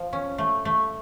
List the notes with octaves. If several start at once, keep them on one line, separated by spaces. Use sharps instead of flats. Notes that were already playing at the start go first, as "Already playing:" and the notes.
Already playing: F3
C#4
A3
A3